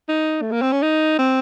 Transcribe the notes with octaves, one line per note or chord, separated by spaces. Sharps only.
D#4
A3
A#3
C4
C#4
D#4
C4